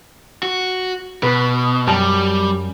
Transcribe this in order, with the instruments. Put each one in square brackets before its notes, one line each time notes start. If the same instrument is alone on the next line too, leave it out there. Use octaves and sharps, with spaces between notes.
[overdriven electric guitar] F#4
[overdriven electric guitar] B2 [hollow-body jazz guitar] B4
[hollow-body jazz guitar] F#2 G5 A5 [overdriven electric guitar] G3